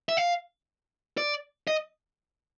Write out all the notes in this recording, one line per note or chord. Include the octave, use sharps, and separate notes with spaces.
E5
F5
D5
D#5